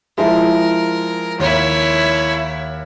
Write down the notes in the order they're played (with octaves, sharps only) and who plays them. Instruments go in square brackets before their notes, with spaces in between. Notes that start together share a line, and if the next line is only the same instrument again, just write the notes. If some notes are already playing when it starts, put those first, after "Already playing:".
[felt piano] F3 G#3 [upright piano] E4 [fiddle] A#4
[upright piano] D#2 [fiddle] E4 C#5